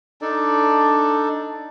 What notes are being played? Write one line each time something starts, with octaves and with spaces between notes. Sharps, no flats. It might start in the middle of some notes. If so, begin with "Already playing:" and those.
D4 D#4 A4 D5